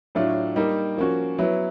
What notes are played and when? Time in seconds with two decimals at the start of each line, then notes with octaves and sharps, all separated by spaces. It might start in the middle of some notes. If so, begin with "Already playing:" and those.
0.15 A2 F#3 A3 D4 F4
0.56 G3 A#3 D#4
0.97 F3 A#3 C#4 F#4
1.39 F#3 B3 E4